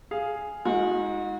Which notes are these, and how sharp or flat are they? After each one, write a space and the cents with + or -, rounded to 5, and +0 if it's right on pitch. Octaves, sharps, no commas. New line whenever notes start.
G#4 +0 F5 -5
G#3 +0 D#4 +35 F#4 -35